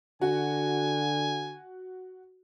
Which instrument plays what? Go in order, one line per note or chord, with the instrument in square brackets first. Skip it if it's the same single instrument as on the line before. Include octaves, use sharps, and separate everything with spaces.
[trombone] D3 [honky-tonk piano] F#4 [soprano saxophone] G#5